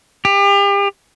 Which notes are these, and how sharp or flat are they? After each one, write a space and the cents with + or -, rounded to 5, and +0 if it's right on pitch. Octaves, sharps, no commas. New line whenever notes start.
G4 +35